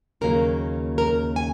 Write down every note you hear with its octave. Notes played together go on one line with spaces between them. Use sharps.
D#2 C#3 F#3 A#3 A#4
A#4
G#5